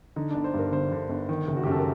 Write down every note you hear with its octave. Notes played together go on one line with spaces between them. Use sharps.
D3 D#4
G1 D4
C5
G2 A#4
G1 C5
D3
G1
D#3
F#1
F#4
G4
F#2 A4
A#4